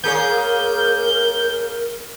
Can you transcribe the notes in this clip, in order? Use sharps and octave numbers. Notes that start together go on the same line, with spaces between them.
A#3 G#4 A#4 C#5 G6